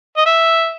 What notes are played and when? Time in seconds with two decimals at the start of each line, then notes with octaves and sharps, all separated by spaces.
0.17 D#5
0.26 E5